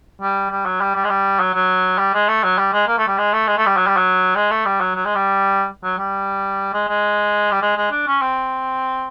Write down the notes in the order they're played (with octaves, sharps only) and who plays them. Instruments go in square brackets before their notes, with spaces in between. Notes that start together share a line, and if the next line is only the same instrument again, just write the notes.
[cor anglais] G3
G3
F#3
G3
G3
G#3
G3
F#3
F#3
G3
G#3
A3
F#3
G3
G#3
A#3
A3
G3
G#3
A3
G#3
A3
G3
F#3
G3
F#3
G#3
A3
G3
F#3
F#3
G#3
G3
F#3
G3
G#3
G#3
G3
G#3
G#3
D4
C#4
C4